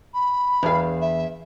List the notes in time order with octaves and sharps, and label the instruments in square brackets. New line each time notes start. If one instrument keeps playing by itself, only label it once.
[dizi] B5
[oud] E2 F5
[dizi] E5